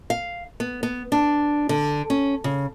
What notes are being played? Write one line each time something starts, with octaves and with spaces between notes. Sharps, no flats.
F5
B3
B3
D4
D3
C#4
C#3